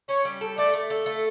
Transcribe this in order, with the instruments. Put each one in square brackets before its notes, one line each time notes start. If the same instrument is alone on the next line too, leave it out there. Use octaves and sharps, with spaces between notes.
[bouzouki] C#4 [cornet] C#5
[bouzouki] G3
A4
[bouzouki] A3 [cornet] D5
[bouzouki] A3
A4
A3